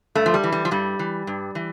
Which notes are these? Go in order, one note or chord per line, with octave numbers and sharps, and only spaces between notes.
G2 A3
F3
G3
E3
G3
F3
G2 G3
E3
G2
E3